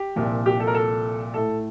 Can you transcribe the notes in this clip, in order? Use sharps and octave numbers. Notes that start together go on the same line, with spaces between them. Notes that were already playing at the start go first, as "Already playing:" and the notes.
Already playing: G4
C2 A#2 F3
G4
A4
A#4
A4
A2 A3 A4